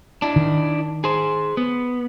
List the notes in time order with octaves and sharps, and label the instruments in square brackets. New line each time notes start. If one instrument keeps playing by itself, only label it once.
[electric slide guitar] D4 E4
[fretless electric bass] D#3
[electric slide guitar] G#4 C5
B3